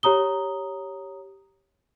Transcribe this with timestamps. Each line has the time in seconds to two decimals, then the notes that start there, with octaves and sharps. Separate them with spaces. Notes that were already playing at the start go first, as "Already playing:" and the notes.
0.03 G4 C#5 A#5 D#6 G7